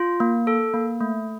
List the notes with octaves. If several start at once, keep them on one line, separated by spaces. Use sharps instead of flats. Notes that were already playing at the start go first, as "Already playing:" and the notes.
Already playing: F4
A#3
A4
A#3
A3